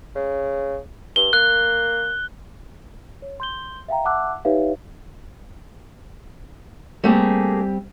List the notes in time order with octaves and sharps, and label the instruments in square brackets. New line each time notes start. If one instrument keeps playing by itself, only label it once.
[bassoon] C#3
[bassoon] G2 [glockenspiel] G7
[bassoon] A#3 [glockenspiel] F#6
[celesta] C#5
C6 G6 G7
E5 F5 G5 A#5
E5 F#5 A5 D6 E6 F#6
D#4 G4 B4 C#5 E5 F5
[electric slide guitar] G3 C4 G4 [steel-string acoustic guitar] A3 A#3 G#4